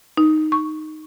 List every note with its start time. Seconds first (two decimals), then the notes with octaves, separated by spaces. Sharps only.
0.17 D#4
0.52 C#6